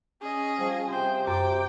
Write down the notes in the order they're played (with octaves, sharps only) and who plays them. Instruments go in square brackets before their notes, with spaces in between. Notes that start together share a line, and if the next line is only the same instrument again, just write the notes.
[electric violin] C#4 D#5 [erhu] G#4
[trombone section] F3 [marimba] G3
[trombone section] C3 [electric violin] C5 G5
[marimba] F#2 [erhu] G5 [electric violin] D6